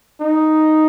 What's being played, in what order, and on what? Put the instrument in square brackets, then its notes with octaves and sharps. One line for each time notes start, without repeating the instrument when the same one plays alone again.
[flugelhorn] D#4